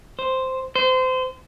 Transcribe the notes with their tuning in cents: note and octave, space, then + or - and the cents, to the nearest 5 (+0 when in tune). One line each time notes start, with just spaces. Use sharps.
C5 -5
C5 -25